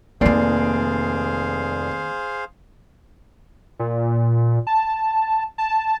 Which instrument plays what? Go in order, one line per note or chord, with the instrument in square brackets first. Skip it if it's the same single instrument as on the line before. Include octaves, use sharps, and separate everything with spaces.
[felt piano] F1 D5 C7 [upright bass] D#3 A#3 [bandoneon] G#4 C5 F5
[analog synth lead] A#2
A5
A5